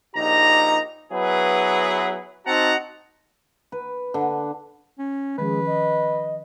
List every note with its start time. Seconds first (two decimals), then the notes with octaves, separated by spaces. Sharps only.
0.16 A#1 D#4 G4 A#5
1.12 F#3 B3 E4 G#4 B4
2.46 C4 D#4 F#4 F#5 A5 A#5
3.72 B4
4.14 D3
4.98 C#4
5.38 D#3 F3 G#3 C#4 B4
5.66 D#5